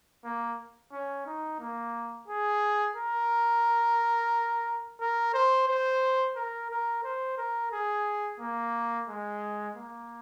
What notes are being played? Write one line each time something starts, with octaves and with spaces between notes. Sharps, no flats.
A#3
C#4
D#4
A#3
G#4
A#4
A#4
C5
C5
A#4
A#4
C5
A#4
G#4
A#3
G#3
A#3